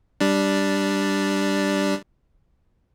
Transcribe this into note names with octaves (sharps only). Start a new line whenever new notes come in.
G3 D4